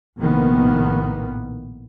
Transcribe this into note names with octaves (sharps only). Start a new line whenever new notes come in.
A#1 A2 C3 D#3 A#3 B3